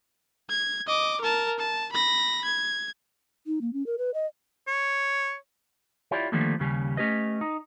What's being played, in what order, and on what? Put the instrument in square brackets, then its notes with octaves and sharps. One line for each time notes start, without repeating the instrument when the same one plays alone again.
[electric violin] G#6
D#5 D6
A#4 A5
A5
B5 A#6
G#6
[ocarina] D#4
A#3
C#4
A#4
B4
D#5
[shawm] C#5
[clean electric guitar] E4 F4 G4 C#5 D5
D3 D#3 F3 G3 A3 A#3
D#2 C#3 G3 C#4
A3 C#4 G4 B4 D#5
D#4